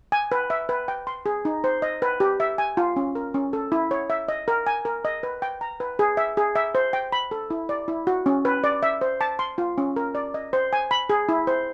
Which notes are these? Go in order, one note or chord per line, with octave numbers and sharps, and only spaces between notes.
G#5
B4
E5
B4
G5
C6
G#4
D#4
C5
D#5
B4
G4
E5
G#5
F4
C#4
A#4
C#4
A4
E4
C#5
E5
D#5
A#4
G#5
A#4
D#5
B4
G5
A#5
B4
G#4
E5
G#4
E5
C5
G5
B5
A4
E4
D5
E4
F#4
C#4
B4
D5
E5
C5
A5
C6
F4
C#4
A#4
D5
D#5
C5
G#5
B5
G#4
E4
C5